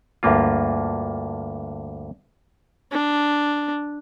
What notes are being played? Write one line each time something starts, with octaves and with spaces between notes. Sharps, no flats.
D2 G2 A#3 F4
D4